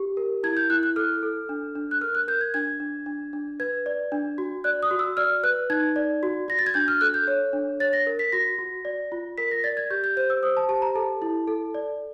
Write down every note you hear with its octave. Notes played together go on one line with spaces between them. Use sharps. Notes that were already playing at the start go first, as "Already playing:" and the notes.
Already playing: G4
A#4
E4 G#6
G6
E4 F#6
F#6
A4 F6
A4
D4
D4
F#6
A#4 F6
F#6
A#4 G6
G#6
D4 G#6
D4
D4
D4
B4 G#6
D5
D4
F#4
D5 F#6
D#6
F#4
E6
D5 F6
B4 F#6
D#4 G#6
D5
F#4
F#4 A#6
A6
G#6
D4 G6
F6
A4 F#6
G6
C#5
D4
C#5 A6
A#6
A#4
B6
F#4 A#6
F#4
D5
F4
A#4 B6
A#6
D5 A6
G#6
G4 G6
G6
C5 G6
E6
C5 D#6
A5
G4 A5
A#5
A4 A5
E4
A4
D5